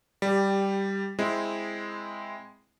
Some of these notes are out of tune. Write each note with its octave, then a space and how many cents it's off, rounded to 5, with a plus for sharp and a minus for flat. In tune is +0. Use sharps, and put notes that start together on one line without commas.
G3 +0 G4 +20
G#3 +0 C4 +0 E4 +0